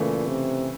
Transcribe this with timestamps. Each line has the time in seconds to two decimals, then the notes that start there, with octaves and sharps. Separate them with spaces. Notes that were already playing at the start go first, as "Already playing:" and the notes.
Already playing: A#2 C#3 E3 A3
0.28 C3